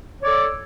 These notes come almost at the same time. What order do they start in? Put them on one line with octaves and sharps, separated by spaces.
C#5 D5 A4